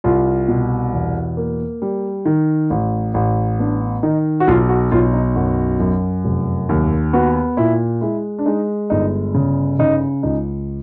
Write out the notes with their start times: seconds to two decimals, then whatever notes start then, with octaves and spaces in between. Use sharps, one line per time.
0.04 C2 F4
0.48 B2
0.93 E2
1.37 A#3
1.82 G3
2.26 D#3
2.70 A1
3.14 A1
3.59 B3 D4
4.03 D#3 D#4
4.40 F#4
4.47 B1 F4
4.69 F#4
4.92 B1 F4
5.14 D#4
5.35 F#2 F#4
5.80 F#2
6.25 F1
6.69 D#2
7.13 B3 F#4
7.57 A#2 E4
8.01 G#3 E4
8.39 D4
8.46 G#3 D#4
8.90 G1 D#4
9.34 C#3
9.79 C#3 D#4
10.23 C#2 D#4